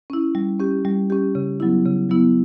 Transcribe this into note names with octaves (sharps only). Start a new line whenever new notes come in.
C#4 E4
G3
C#4 G4
G3
C#4 G4
C#3
F#3 B3 E4
C#3
F#3 B3 E4